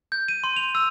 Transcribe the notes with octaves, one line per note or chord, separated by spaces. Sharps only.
G6
D#7
C6
F7
E6